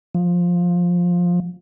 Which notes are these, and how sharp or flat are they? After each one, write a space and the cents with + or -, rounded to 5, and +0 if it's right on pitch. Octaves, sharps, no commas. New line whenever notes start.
F3 +10